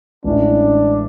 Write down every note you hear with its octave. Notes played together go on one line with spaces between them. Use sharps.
A1 A2 G#3 C#4 D4 E4